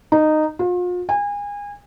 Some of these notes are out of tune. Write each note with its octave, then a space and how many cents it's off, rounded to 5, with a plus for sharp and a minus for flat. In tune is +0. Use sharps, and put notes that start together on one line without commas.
D#4 -15
F4 +40
G#5 -30